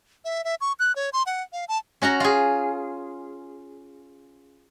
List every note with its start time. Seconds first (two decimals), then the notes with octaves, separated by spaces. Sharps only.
0.25 E5
0.44 E5
0.61 C#6
0.79 F#6
0.96 C#5
1.13 C6
1.26 F#5
1.53 F5
1.68 A5
2.02 C#4 F#4 F#5 A#5
2.20 F4 G#4